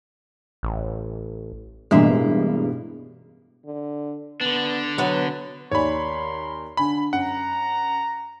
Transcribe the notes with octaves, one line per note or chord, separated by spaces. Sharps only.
A1
A1 G2 B2 G#3 A#3 D4 E5
D3
D3 B3 D4
F#3 B3 B4
D#2 A#4 C#5 D5 G#5 B5 C6
D3 G#5 B5
F#2 F#5 A#5